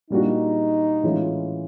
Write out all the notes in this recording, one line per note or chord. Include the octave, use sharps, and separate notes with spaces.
A#2 G3 A#3 D4 D#4 F#4
A2 E3 G#3 C#4 F4